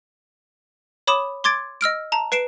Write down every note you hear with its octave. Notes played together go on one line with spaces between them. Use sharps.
C#5 B5 D6 D#6 E7
C6 D6 G#6 A6 D7
D#5 E6 F6 D7
A5 A#5
B4 C7 D7 E7